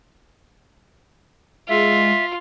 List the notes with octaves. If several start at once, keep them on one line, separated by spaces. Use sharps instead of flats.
G#3 F4 E5